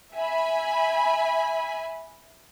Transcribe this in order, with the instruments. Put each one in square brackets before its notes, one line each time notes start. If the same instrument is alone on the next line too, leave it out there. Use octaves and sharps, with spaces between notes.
[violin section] E5 G#5 B5